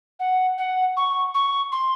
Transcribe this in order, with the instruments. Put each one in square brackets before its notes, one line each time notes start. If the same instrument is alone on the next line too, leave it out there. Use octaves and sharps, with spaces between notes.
[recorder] F#5
F#5
C#6
C#6
C6